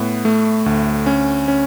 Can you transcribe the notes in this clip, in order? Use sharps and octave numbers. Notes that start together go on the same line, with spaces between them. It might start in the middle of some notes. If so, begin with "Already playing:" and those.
Already playing: A2 B3
A3
D2
C#4
C#4